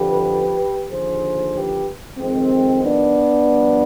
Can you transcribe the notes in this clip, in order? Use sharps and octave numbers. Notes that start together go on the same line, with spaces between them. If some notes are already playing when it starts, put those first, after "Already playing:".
Already playing: F2 D3 F3 G4 B4
D#2 D3 F3 G#4 C5
G4 B4
F2 D#3 G#3 C4
B3 D4
G2 F3